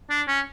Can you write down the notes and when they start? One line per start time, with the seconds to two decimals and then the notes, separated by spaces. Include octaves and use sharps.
0.10 D4
0.28 C#4